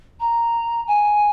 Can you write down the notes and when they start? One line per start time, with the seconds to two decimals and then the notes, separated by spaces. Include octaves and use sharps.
0.20 A#5
0.87 G#5